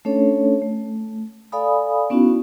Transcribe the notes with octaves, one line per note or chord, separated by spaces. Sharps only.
A3 C#4 D4 A4 C#5
A3
A4 D5 F5 G#5 B5 D#6
B3 C#4 D#4 E4 F#4